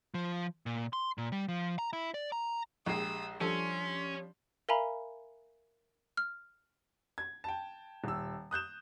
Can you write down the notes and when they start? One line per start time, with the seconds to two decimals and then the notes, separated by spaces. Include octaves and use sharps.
0.14 F3
0.66 A#2
0.93 C6
1.18 A#2
1.32 G3
1.48 F3
1.79 A#5
1.93 E4
2.14 D5
2.32 A#5
2.86 A#1 G#3 G4 D#6 E6 C7
3.41 F3 G3 C#4 D4 A4 C6
4.69 A#4 E5 F5 G#5 A#5 B5
6.17 F6
7.18 G#6
7.44 G5 A5
8.04 D#1 E6
8.51 D#6 F#6 G6 E7